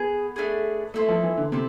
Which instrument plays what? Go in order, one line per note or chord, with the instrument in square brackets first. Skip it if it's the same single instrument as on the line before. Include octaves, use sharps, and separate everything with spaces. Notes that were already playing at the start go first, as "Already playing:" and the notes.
Already playing: [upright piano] B3 [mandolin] G#4
[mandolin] A3 D4 G#4
[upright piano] A3 [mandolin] C4 E4 A4
[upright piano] F3
E3
D3
[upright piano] C3 [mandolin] C4 E4 A4